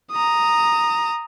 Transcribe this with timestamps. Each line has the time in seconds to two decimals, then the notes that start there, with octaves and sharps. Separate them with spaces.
0.12 A#5 D#6